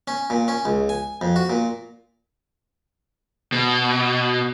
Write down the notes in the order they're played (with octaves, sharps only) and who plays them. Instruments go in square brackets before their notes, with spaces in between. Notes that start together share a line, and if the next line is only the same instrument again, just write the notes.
[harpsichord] C#4
A#2
C#4
C#2
G#5
F2
F#4
A#2
[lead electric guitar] B2